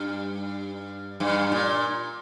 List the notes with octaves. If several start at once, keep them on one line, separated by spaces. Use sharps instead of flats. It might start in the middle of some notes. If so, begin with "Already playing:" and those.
Already playing: G2
G2
A#2